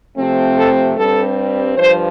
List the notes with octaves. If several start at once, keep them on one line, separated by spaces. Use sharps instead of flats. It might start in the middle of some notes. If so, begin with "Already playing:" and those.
C3 F3 A3 C4
A4
G2 G3 C4 A4
G2 F3 C5